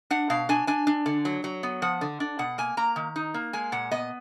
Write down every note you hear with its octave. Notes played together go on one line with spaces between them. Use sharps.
D4 F#5
B2 F5
D4 G#5
D4 G#5
D4
D3
F#3
F#3
B3
F3 F#5
D3
D4
B2 F#5
A#3 G#5
A#3 A#5
D#3
D#4
A#3
G#3 G#5
A#2 F#5
B3 D#5